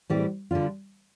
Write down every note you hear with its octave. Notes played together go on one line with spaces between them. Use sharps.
A2 E3 G3 C4 G4
D3 G3 D4 F4